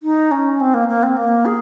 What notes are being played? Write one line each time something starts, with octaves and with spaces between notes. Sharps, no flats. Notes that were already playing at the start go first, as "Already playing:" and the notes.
D#4
C#4
C4
A#3
A#3
C4
A#3
G#4